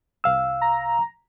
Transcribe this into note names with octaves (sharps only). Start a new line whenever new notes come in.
C2 F5 E6
A#5